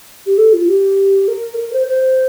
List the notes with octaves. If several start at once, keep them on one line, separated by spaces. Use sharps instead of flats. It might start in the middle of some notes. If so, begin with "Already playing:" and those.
G4
A4
F4
G4
A#4
A#4
C5
C5